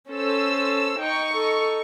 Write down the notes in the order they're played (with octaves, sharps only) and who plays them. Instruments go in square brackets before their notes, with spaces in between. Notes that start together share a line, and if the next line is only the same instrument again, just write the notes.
[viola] C#4 [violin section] A4 C5 E6
[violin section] D#4 C#6 [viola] G5
[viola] A4